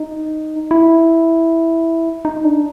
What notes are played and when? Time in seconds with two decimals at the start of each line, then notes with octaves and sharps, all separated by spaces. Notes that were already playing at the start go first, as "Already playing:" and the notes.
Already playing: D#4
0.71 E4
2.25 D#4
2.44 D4